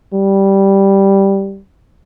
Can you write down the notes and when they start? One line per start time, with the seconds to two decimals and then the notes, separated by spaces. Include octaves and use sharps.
0.13 G3